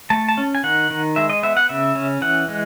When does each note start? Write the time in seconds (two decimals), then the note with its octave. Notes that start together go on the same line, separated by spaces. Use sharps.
0.10 A3 A5
0.29 A5
0.37 C#4
0.55 G#5
0.63 D#3 F#5
0.90 D#3
1.16 G#3 E5
1.30 D#5
1.43 B3 E5
1.57 F#5
1.69 C#3 E5
1.95 C#4
2.22 E3 F#5
2.49 G#3